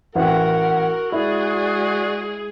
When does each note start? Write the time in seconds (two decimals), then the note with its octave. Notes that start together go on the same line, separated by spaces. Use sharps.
0.15 A1 F#4 A#4 F#5 G5
1.12 G#3 E4 G#4 D5